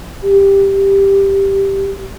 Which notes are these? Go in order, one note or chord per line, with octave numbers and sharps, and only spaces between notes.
G4